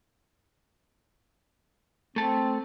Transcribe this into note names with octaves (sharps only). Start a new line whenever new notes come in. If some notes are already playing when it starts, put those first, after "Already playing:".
A3 C4 A5